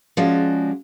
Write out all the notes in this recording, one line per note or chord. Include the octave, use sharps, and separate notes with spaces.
F3 G#3 C#4 F#4 D5